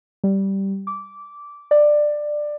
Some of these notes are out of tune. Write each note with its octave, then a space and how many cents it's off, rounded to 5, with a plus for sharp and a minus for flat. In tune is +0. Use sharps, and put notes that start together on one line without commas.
G3 -10
D6 -15
D5 +15